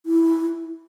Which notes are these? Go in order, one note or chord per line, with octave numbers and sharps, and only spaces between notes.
E4